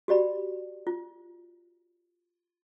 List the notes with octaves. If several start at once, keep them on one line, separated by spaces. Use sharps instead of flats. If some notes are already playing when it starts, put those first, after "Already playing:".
F#4 G4 D5 B5
F4